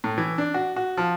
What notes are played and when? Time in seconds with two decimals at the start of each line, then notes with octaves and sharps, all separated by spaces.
0.04 A2
0.18 E3
0.38 D4
0.54 F#4
0.76 F#4
0.97 F3